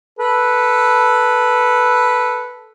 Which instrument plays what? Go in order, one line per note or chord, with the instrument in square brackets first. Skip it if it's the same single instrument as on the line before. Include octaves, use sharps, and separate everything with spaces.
[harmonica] A4 B4